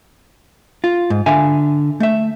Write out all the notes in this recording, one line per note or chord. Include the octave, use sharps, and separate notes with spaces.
F4
G#2
D3 E5 F5 G#5
A3 E5